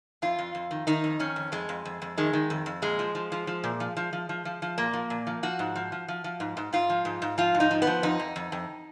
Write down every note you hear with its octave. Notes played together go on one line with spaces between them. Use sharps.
F2 F4
F2
F2
D#3
D#3 D#4
F2
D#3 C#4
F2
F2 G#3
F2
F2
F2
D#3 G#3
D#3
F2
F2
A#2 G#3
F3
F3
F3
F3
A#2
F3
F3
F3
F3
F3
F3
A#2 A#3
F3
A#2
F3
F3 F#4
G#2
F3
F3
F3
F3
G#2
G#2
G#2 F4
F3
G#2
G#2
F3 F4
G#2
D#4
F3
B3
F3
F2 D#4
F2
F2
F2